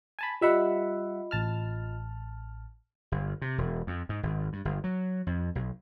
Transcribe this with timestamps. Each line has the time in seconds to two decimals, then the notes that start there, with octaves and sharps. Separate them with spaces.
0.19 G#5 A5 B5
0.41 G3 F4 D#5 E5 F#5 B5
1.31 A1 A5 F6
3.12 G1
3.42 C3
3.58 E1
3.87 F2
4.09 G#2
4.23 G#1
4.53 G2
4.65 G1
4.84 F#3
5.27 F2
5.55 B1